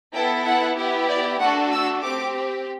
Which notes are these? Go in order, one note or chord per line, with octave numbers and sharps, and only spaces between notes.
B3 E4 A4 G5
F#5
B3 E4 G4
D5
A3 D4 F#4 A4 F#5
E6
C4 G4 D6